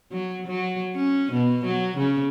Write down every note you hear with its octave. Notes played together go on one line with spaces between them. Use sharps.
F#3
F#3
C#4
B2
F#3
C#3